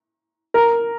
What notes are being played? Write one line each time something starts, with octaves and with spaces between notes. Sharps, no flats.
A#4